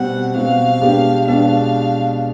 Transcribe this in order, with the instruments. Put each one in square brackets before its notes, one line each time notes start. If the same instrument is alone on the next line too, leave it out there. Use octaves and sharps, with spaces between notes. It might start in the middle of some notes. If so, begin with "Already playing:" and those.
Already playing: [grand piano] B2 G3 C4 [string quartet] F#5
[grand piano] B2 G3 C4 [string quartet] F5
[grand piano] B2 G#3 B3 D4 G4
[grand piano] B2 G#3 B3 D4 G4 [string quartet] F5